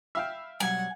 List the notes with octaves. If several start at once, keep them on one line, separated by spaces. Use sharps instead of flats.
E5 F5 G5 B5 E6 F6
B2 F#3 G3 F#5 G#5